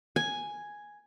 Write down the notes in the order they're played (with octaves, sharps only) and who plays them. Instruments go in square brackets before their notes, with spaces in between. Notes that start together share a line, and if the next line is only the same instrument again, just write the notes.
[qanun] G#5